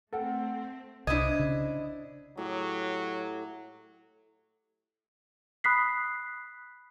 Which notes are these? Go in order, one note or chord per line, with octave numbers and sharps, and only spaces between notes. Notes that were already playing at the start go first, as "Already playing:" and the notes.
A3 C4 A4 A#4 F#5 G5
C2 D4 E4 C5 D#5 G#6
C#3
A2 F#3 F#4 G4
B5 D#6 F#6 B6 C7